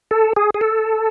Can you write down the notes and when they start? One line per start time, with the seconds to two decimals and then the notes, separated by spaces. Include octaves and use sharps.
0.11 A4
0.36 G#4
0.54 G#4
0.61 A4